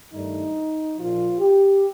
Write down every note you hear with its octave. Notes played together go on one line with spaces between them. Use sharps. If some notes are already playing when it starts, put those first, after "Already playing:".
G2 D#3 A3 D4 D#4
A#1 A#2 F3 F4
G4